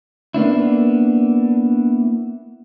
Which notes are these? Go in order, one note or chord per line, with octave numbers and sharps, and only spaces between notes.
A#3 B3 D4 E4